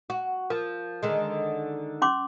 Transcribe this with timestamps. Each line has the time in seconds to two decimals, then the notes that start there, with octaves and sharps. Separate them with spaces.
0.10 F#4
0.50 F3 A#4
1.03 D3 D#3 G#3
2.02 C#4 C6 D6